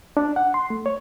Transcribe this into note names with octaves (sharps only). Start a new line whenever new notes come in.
D4
F#5
C6
A3
C#5